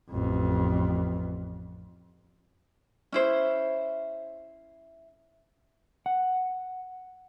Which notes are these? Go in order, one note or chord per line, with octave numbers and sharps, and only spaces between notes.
A1 F2
C#4 E4 C5
F#5